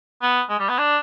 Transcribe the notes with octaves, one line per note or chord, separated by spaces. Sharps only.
B3
G#3
G3
B3
D4